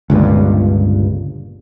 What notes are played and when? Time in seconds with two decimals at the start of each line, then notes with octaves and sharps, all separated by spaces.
0.10 G1 C#2 G2 A#2